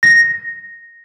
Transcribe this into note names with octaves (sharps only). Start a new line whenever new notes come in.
A#6